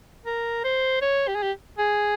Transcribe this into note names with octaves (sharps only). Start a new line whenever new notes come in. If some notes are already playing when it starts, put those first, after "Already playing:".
A#4
C5
C#5
G4
G#4
G4
G#4